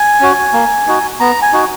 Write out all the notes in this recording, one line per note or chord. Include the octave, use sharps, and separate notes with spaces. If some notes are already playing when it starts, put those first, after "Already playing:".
Already playing: G#5
C#4 F#4
A#3
D#4 F#4
B3 A#5
G#5
D#4 F#4